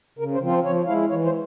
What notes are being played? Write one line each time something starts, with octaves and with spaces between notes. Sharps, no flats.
C#3 A#4
C5
F3 C4 F4
C5
F3 C#5
G#3 E4 F5
E3 C#5
C5